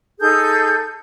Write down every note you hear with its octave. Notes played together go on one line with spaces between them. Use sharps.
D#4 G#4 A4 G6